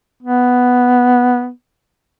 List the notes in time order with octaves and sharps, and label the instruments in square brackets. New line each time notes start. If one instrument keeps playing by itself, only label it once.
[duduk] B3